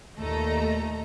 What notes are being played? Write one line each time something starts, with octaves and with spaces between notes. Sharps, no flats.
D#2 A#2 A3 A4 D#5 A#5